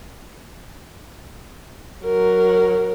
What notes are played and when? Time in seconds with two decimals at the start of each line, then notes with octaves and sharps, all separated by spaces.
2.04 F#3 A#4